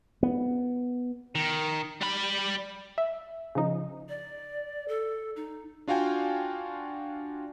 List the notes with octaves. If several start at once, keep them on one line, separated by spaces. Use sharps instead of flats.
B3
D#3
G3 B5
E5
C#3 F3 D#4
D5
A4
D#4
D4 F4 F#4 F5 G5 G#5